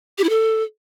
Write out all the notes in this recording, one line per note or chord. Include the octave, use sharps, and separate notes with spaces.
G4
E4
A4